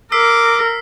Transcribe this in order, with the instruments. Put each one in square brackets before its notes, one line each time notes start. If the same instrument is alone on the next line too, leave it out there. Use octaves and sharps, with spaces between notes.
[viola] A#4 [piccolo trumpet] D6 [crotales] E6 B6 C7